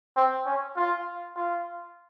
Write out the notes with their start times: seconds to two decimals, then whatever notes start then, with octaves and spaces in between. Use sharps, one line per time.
0.16 C4
0.46 C#4
0.76 F4
1.36 F4